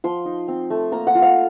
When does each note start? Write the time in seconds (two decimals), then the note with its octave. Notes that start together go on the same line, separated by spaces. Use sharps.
0.04 F3 C6
0.25 D#4
0.48 C4
0.70 A3
0.92 A#3 A#5
1.07 F#5
1.15 F4
1.22 F5